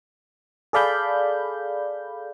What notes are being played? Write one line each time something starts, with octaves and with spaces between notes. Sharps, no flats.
G#4 A4 D5 F5 B5 G6